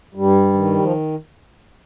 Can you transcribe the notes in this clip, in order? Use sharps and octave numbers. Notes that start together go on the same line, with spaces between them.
G2 G3
D#3
F3